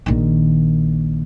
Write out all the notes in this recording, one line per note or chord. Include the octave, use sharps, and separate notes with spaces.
A#1 D#3